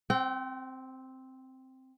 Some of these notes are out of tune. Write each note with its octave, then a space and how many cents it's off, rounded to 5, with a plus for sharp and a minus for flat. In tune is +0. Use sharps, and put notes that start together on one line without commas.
C4 +0 G5 -40